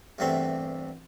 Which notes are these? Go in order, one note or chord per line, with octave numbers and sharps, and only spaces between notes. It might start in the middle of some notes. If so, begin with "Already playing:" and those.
E2 G2 C3 A3 C4